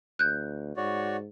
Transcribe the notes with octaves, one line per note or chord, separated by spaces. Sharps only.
D2 F#6 G6
G#2 F#4 C#5 D5